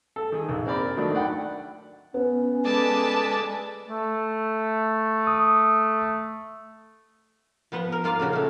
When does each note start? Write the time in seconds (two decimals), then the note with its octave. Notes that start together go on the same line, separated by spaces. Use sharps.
0.16 A4
0.32 D#3 G#4
0.49 A#1
0.66 C4 A#4 D5 B5
0.97 D#3 F#3 A3 D4
1.15 D5 F#5 G5 B5
2.14 B3 C#4
2.65 G#3 A4 B4 D5 A5
3.88 A3
5.27 D#6
7.72 F3 B3 B4 F#5
7.92 A#4
8.04 A#3 F4 D5 F5
8.20 A#2 C#3 F#4
8.33 A3 F#4